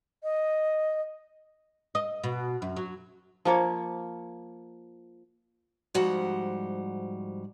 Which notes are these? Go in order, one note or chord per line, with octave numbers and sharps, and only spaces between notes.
D#5
D#5
B2
F#2
F#3
F3 A#3 C#5
G#2 F3 G3 F#4 F#5